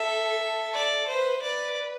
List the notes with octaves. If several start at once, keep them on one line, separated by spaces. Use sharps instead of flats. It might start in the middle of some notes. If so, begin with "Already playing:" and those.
Already playing: A4 E5
A4
D5
B4 C5
B4 D5